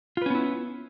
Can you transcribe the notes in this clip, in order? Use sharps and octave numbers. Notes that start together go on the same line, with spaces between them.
B3 C#4 E4 F4 B4